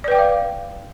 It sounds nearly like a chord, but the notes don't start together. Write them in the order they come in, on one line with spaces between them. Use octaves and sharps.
D5 B4 G5 D6 F5